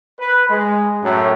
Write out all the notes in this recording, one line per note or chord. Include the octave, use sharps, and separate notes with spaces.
B4
G#3
F#2 A2